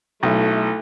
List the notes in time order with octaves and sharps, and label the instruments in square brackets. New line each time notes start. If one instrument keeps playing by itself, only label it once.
[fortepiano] B1 [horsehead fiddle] A3 E4